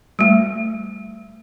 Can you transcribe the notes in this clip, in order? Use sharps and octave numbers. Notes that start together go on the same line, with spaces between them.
G3 A3